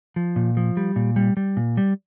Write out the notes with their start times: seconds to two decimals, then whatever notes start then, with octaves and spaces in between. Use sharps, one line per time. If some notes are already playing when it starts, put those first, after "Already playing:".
0.16 F3
0.36 A#2
0.57 F3
0.77 G3
0.96 A#2
1.16 G3
1.37 G3
1.57 A#2
1.77 G3